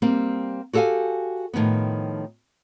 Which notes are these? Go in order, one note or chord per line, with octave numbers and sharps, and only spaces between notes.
G3 A#3 C4
F#4 G4 A4 D5 F5 G#5
A2 D#3 F3 B3